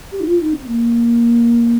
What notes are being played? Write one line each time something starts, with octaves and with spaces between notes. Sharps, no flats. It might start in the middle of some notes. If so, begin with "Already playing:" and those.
G4
D#4
F4
D#4
C4
A#3